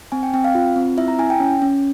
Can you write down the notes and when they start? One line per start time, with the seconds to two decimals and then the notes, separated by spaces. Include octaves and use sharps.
0.12 C4 G#5
0.23 G5
0.34 C4 G5
0.44 F5
0.55 F4
0.76 C4
0.97 E4 E5
1.08 A#5
1.19 E4 G#5
1.30 G5
1.40 C#4
1.62 C#4